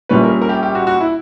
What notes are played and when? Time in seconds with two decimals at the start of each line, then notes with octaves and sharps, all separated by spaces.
0.09 A#1 A#2 G3 C#4 B4
0.23 A#4
0.42 A#4
0.49 G4
0.63 G4
0.75 F#4
0.87 F#4
1.00 E4